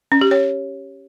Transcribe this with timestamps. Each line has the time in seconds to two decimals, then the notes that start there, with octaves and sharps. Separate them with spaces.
0.12 C#4
0.21 G4
0.31 C#5